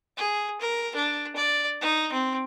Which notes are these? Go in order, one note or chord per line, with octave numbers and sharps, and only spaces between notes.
G#4
A#4
D4
D5
D#4
C4